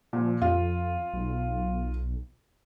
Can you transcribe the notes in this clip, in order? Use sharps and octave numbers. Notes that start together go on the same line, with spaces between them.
A#2 F3
F2 F4
B1